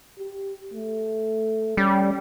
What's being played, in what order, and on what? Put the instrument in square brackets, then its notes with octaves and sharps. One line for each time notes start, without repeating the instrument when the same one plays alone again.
[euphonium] G4
A3
[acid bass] G3 [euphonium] C#4